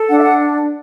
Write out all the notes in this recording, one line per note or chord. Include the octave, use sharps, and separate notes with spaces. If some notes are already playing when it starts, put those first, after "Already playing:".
Already playing: A4
D4 F#5
E5
F#5